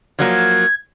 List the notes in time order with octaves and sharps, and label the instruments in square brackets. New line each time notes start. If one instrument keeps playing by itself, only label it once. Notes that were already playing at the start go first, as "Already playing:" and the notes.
[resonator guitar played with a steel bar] F3 F#3 A#3 [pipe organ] G#6